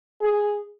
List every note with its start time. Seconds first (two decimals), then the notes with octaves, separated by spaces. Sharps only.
0.21 G#4